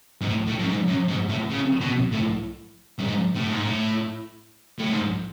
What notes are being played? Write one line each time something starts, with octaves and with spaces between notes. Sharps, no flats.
G#2
A2
A2
F#2
G#2
F#2
G#2
A2
C#3
B2
A2
F#2
G#2
A2
G#2
A2
A2
G#2